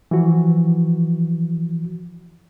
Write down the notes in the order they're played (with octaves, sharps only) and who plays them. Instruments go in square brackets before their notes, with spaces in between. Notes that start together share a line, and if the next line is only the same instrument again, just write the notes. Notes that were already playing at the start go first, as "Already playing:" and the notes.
[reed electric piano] E3 F3 F#4